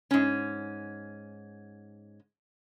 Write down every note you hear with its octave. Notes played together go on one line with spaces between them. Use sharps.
G#2 C#4